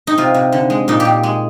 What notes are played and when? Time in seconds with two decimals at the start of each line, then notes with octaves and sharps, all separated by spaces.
0.07 D#4
0.18 C3 F4
0.34 C3
0.52 D3
0.70 G#3
0.88 A#2 D#4
1.00 G4
1.05 A#2
1.23 G#3